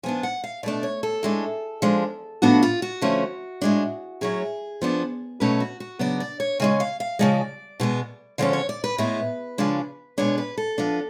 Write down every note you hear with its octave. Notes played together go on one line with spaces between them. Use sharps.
F3 B3 D4 G#5
F#5
F5
B2 A3 D4 D5
C#5
A4
A2 G#3 D4
F3 G#3 D4
A2 F3 B3 D4 F#4
F4
F#4
D3 F3 A3 C#4
A2 G#3 D4
A2 F#3 C#4 G#4
F3 B3 D4
B2 F#3 A3 C#4 B4
F#4
F#4
C#3 F#3 B3 D4 D5
D5
C#5
C#3 G#3 C#4 G#5
F5
F5
C#3 F3 G#3 D5
B2 G#3 B3
D3 F3 G#3 C#4 D5
C#5
D5
B4
A2 G#3 B3 B4
C#3 F3 G#3 D4
B2 G#3 B3 D4 C#5
B4
A4
F3 B3 D4